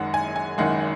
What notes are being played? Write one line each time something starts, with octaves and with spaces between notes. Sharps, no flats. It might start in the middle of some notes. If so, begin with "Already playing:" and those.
Already playing: F#1 F#2 D#3 G#3 F#5
G#5
G#5
F#1 F#2 D#3 G#3 F#5